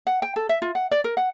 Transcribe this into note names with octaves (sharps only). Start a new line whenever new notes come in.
F#5
G5
A4
E5
F4
F#5
D5
A#4
F#5